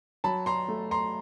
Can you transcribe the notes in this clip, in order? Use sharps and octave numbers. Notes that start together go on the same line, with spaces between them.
F#3 A5 B5
A#5 C6
A3
A#5 C6